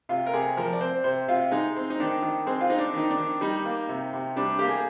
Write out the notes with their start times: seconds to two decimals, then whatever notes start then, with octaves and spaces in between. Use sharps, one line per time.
0.09 C3 F4
0.27 A#4
0.33 C3 G#4
0.57 F3 A#4
0.73 D5
0.81 C4 C5
1.04 C3 C5
1.28 C3 F4
1.51 G#3 D#4
1.76 C4
1.90 D#4
2.00 D#3 D4
2.22 D#3
2.47 G#3 C4
2.61 F4
2.70 C4 D#4
2.78 D4
2.94 D#3 D#4
3.11 D4
3.18 D#3
3.41 G3 D#4
3.65 A#3
3.89 C3
4.13 C3
4.36 G3 D4
4.59 A#3 G4
4.68 G#4